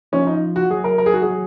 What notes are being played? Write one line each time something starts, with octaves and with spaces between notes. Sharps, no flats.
F3 C#4
D#4
F#4
F#3 G#4
A#4
A#4
G#4
F#4
F#3 G#4